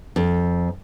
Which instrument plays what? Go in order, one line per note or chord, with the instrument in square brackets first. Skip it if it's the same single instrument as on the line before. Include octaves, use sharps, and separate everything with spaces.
[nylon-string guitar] F2